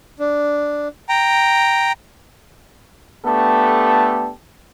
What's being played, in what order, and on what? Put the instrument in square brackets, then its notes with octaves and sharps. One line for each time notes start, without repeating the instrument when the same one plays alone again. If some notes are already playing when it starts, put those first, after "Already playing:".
[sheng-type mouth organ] D4
G5 A#5
[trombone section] A3 B3 D4 G4 A4